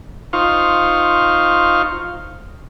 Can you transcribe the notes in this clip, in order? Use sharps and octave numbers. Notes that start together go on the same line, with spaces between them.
D#4 F4 C5 F5 C#6